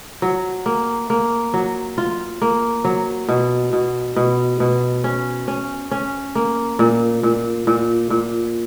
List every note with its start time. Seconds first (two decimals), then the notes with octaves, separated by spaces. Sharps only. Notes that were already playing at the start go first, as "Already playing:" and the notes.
0.22 F#3
0.66 A#3
1.10 A#3
1.54 F#3
1.98 F4
2.42 A#3
2.85 F#3
3.28 B2
3.73 B2
4.16 B2
4.60 B2
5.04 C#4
5.48 C#4
5.91 C#4
6.35 A#3
6.79 A#2
7.23 A#2
7.67 A#2
8.10 A#2